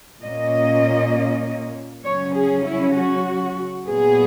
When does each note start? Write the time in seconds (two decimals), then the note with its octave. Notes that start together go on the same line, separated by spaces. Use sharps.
0.22 A#2 A#3 C#4 D#5
2.04 C#3 F#3 C#4 C#5
2.35 G#4
2.65 E4
2.95 F#4
3.86 A#2 F#3 B3 G#4